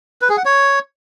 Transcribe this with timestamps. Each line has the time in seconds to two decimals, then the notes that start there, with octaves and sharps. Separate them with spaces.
0.21 B4
0.29 G#4
0.37 F#5
0.45 C#5